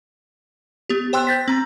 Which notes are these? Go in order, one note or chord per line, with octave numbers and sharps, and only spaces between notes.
B3 G4
C5 G5 C6 E6 F#6
G6 A6 B6
C4 A#5